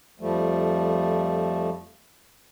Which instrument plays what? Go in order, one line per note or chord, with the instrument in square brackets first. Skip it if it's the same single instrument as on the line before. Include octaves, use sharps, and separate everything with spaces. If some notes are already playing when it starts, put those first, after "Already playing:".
[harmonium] F2 F3 G3 A3